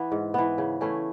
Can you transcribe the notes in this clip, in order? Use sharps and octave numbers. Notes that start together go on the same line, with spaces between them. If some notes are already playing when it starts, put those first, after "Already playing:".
Already playing: E3 B3
G#2
E3 B3
C#3
E3 A3 C#4